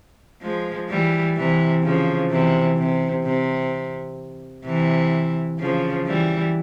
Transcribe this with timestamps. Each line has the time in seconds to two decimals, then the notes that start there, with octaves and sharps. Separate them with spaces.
0.42 F3 G#3
0.89 E3 G3
1.36 C3 E3
1.83 C#3 F3
2.30 C3 E3
2.77 C3
3.24 C3
4.65 C3 E3
5.59 C#3 F3
6.07 E3 G3